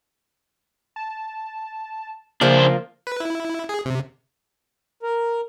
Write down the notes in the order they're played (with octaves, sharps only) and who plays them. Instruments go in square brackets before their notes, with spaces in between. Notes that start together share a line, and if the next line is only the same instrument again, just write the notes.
[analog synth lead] A5
[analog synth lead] C#3 [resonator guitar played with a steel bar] F3 A#3 F4 [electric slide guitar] D4 C5
[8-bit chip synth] B4
E4
G#4
C3
[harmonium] A#4